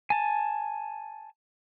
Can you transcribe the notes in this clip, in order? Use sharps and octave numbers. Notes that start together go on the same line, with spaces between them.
G#5 A5